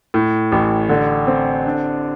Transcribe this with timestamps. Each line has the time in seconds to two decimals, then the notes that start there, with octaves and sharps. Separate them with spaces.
0.14 A2
0.52 A1
0.89 D3
1.27 C4
1.65 D4